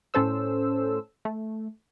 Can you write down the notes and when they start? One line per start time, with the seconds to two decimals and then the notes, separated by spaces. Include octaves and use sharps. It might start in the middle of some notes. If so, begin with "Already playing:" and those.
0.14 A2 C#4 A4 C5 E6
1.25 A3